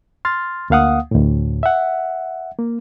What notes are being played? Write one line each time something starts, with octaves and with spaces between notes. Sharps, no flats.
C6 F6 A6
D2 A#3 F5 F#5 D#6
D2 A2
E5 F#5
A#3